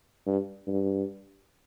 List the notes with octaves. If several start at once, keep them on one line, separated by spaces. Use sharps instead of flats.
G2
G2